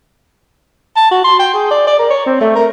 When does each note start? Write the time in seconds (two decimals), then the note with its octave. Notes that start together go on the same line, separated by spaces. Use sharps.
0.96 A5
1.11 F#4
1.24 C6
1.39 G5
1.54 G#4
1.71 D5
1.87 D5
1.99 A#4
2.11 C#5
2.26 C4
2.41 A3
2.56 A#4